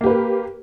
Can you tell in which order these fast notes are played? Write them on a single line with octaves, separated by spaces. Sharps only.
A#3 G4 B4 A#4